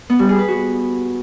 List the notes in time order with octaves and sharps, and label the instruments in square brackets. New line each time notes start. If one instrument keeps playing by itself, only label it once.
[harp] B3
G3
G#4
B4
F#4